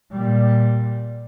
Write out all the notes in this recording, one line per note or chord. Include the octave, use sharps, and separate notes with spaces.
A#2 G3